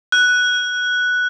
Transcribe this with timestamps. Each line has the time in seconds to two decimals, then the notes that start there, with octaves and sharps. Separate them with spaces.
0.12 F#6